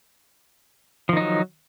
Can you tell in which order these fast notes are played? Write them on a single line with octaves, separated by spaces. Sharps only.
F3 D#3 D#4 F#3